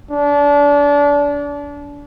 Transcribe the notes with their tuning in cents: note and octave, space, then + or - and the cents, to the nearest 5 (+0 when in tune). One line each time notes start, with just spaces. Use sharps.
D4 -30